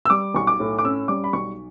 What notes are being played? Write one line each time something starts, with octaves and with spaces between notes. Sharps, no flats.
E6
G3 D6
B1 C#6
D6
A2
D6
C#4 E6
G3 D6
B5
B1 C#6